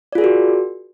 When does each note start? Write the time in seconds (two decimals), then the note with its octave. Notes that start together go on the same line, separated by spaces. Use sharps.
0.13 D5
0.15 F4
0.18 G#4
0.21 A#4
0.24 F#4